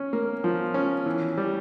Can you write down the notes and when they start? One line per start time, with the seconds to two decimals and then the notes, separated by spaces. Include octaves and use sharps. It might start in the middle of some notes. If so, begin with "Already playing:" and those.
Already playing: C#4
0.13 A#3
0.44 F3
0.74 C#4
1.06 E3
1.38 G3